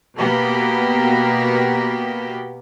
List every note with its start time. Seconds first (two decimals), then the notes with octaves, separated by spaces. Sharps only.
0.16 B2 A#3 B3 G4